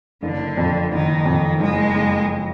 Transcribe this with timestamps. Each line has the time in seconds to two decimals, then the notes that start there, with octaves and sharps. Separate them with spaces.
0.23 F#1 D3
0.57 F2
0.92 F#1 D#3
1.26 F2
1.60 F#1 G#3
1.95 F#1